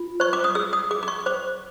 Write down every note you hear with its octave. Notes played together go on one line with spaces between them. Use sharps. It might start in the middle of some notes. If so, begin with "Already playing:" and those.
Already playing: F4
C5 C#6
D6
D#6
G#4 E6
D#6
G#4 D6
D6
C#6
C5 D6